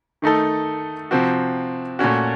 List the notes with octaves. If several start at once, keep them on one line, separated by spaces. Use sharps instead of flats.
D#3 A3 D#4 A4
C3 F3 C4 F#4
A#2 A3 C#4 F#4